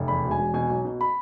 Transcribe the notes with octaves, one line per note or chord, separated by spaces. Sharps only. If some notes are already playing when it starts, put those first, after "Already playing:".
Already playing: F1
E2 B5
E1
G#5
E1
B2 G#5
B1
B2
B5